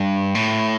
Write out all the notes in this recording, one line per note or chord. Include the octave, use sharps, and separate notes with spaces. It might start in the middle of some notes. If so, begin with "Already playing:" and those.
Already playing: G2
A2